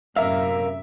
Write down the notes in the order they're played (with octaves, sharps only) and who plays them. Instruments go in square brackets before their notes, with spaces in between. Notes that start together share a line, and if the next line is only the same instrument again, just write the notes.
[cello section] F#2 A2 C3 [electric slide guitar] A#4 F5 [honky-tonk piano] E5